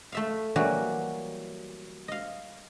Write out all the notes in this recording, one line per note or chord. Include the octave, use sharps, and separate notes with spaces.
A3 E5 F5
E3 F#3 G3 A#3 F#4
D#5 F5